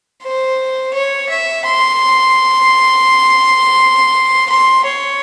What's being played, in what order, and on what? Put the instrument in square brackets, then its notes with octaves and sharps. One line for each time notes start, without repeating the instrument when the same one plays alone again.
[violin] C5
C#5
E5
C6
C6
C#5